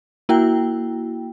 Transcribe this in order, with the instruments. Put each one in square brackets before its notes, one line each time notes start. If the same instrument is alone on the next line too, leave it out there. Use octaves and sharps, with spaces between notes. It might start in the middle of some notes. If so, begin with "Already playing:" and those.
[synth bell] A#3 E4 F#4 G5